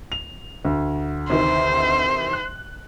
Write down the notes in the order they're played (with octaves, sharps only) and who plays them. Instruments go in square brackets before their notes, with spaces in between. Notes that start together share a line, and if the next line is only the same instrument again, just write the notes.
[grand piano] F7
D2
[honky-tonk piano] C3 D#3 E3 [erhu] C5
[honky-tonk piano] F#6